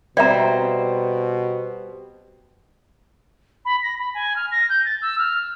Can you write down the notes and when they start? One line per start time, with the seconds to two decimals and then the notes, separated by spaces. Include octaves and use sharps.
0.17 B2 G3 C4 D5 E5 A#5
3.65 B5
3.82 A#6
3.99 B5
4.14 G#5
4.36 F6
4.51 A#6
4.69 G6
4.85 A6
5.01 E6
5.18 F6